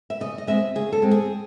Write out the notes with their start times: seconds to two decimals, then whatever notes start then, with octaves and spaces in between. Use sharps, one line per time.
0.10 E5
0.20 C#3 D#5
0.38 D#5
0.47 G#3 C4 E5
0.75 C#3 G#4
0.92 A4
1.02 G#3 C4
1.11 G#4